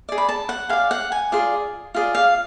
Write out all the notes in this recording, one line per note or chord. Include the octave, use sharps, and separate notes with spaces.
G#4 D5
B5
A5
F#5
G#4 D5 F5
F#5
G#5
F4 G#4 D5
F4 G#4 D5
F5